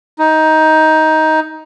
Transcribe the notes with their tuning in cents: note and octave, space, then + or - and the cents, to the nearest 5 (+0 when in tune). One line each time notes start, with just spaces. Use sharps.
D#4 +15